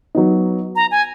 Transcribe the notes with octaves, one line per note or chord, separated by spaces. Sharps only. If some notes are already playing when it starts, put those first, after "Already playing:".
F#3 B3 D#4
A#5
G#5